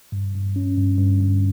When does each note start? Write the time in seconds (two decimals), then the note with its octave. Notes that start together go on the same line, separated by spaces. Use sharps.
0.12 G2
0.34 G2
0.56 C#4
0.77 G2
0.98 G2
1.20 G2